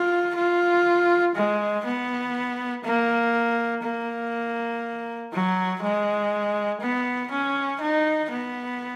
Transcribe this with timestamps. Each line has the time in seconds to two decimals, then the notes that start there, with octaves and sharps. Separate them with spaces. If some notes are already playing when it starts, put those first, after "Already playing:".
Already playing: F4
0.35 F4
1.35 G#3
1.85 B3
2.85 A#3
3.83 A#3
5.33 F#3
5.82 G#3
6.81 B3
7.31 C#4
7.81 D#4
8.31 B3